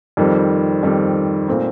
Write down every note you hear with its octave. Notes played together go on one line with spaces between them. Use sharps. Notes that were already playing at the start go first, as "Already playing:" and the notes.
F2 D#3 G3 C4
F2 D#3 G3 C4
A#2 A3 C4 D#4